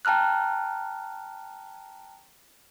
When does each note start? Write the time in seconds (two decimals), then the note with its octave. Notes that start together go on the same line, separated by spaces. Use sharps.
0.05 G5 A5 A#5 F6 F#6